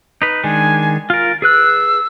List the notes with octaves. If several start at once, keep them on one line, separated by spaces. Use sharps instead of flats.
D#4 B4
D#3 G#3 D4 G#5
F4 A#4 A6
G#4 B4 E6 F#6